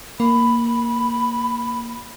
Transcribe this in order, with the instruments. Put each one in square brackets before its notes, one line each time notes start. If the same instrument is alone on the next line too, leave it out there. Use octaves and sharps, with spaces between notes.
[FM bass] A#3 [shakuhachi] B5